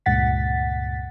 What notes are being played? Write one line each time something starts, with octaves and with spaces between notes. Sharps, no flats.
C#2 G2 A#2 F#5 A6 B6